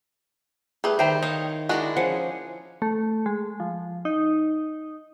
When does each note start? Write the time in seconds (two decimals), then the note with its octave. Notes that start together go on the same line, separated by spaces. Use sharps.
0.84 G3 A3 G#4 B4
0.99 D#3 C5 E5 G5 A#5
1.23 C#5 D#5 F5
1.69 G#3 D4 E4 F#4 A#4 D#5
1.97 F3 C#4 G#4 F#5
2.82 A3
3.26 G#3
3.60 F3
4.05 D#4